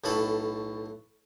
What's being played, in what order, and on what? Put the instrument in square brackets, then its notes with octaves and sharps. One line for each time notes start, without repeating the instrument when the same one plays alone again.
[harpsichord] B1 A2 C#4 A4 B5